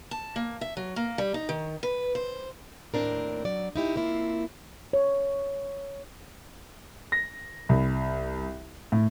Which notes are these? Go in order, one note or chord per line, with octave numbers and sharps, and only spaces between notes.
A5
A#3
E5
F#3
A#3
G3
D#4
D#3
B4
C5
D#2 A2 C3 C4 D4 A#4
F#3 D5
D#4 E4 G4
A#3 C4 E4 F4
C#5
A#6
C2
A2